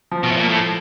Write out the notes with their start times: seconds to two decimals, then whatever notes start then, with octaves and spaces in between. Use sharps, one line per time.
0.11 F3
0.23 B2
0.32 A2
0.37 A#2
0.49 A2